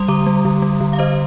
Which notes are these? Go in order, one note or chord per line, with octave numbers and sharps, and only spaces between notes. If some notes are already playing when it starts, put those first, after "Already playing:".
Already playing: G3 C6 D#6
D3 A#5 D6
G3
D3
G3
D3
F5
D3 C5 D#5